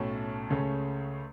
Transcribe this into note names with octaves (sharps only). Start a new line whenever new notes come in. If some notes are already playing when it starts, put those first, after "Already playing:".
Already playing: B1 A2 A3 C#4 A5
C#2 C#3 A3 C#4